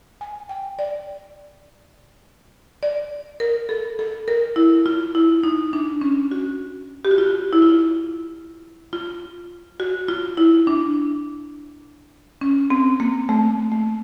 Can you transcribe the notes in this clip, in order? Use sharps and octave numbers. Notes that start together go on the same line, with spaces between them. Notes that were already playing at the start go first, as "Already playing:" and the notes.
G#5
G5
D5
D5
A#4
A4
A4
A#4
E4
F4
E4
D#4
D4
C#4
F#4
G4
F#4
F4
E4
F4
F4
F#4
F4
E4
D4
C#4
C4
A#3
A3
A3